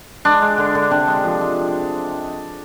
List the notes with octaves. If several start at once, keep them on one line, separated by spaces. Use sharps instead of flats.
G#3 D4
G#3
D3
D3
C3 D4
G#3
F3
G#3